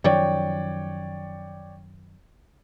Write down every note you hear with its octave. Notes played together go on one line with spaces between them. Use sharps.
F#2 D#3 F3 C#5 D5 G5